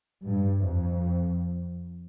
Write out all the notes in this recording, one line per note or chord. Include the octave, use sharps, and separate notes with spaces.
G2
F2